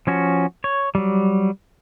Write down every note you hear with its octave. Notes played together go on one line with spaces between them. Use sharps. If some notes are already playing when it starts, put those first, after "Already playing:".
F3 C#4 F#4
C#5
F#3 G3